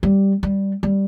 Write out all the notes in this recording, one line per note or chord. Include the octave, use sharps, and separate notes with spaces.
G3
G3
G3